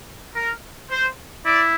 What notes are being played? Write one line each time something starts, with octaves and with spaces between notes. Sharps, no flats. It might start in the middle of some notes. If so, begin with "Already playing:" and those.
A#4
C5
E4 D5